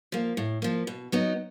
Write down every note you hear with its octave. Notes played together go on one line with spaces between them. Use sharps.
F3 A#3
A2
F3 A#3
B2
F#3 B3 D#4